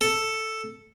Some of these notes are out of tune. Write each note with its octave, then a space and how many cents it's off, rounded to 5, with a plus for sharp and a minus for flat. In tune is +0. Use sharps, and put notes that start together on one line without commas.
A4 +5